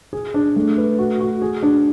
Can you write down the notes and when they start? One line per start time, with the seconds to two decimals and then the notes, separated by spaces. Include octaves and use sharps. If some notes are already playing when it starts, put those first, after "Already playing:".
0.13 G#4
0.34 D4
0.56 A3
0.77 B4
0.99 F#4
1.20 F#4
1.42 G#4
1.63 D4